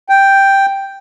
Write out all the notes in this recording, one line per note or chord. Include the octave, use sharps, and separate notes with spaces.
G5